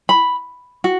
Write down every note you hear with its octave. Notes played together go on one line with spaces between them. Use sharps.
B5
F#4